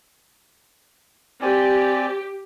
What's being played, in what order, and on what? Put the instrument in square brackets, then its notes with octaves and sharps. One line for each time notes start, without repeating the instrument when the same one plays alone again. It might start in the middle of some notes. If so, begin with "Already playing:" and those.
[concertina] C4 D5 G#5 [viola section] G4